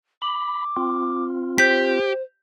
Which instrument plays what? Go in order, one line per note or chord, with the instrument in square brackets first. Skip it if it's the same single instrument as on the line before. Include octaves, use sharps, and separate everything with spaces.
[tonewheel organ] B5 [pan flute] D6
[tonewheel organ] C4 F4
[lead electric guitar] G4 [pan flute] C5 [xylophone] G6 B6